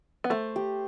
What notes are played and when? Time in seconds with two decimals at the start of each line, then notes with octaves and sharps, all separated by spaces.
0.24 B3
0.30 A3 C5
0.56 G4